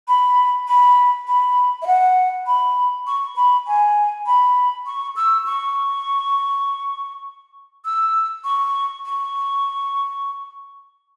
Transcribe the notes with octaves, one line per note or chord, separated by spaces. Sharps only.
B5
B5
B5
E5
F#5
B5
C#6
B5
G#5
B5
C#6
E6
C#6
E6
C#6
C#6